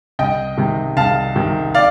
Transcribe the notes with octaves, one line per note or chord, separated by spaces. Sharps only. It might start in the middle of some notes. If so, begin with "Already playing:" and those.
C2 D#5 G5
C3 D#3
C2 F5 A5
C3 D#3
D5 F5